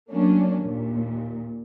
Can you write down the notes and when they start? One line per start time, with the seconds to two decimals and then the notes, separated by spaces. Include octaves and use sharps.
0.11 F#3 A3 A#3 C#4 D4
0.61 D#2 A#2